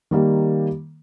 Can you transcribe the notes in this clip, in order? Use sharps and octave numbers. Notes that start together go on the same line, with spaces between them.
D#3 G3 A#3